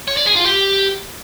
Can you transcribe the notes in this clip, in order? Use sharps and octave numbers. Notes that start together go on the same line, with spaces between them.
C#5
D5
G#4
F4
G4